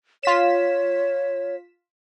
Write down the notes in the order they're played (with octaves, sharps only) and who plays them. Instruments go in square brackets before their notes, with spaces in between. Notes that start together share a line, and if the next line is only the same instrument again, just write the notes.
[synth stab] F4 B6 E7 [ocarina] C#5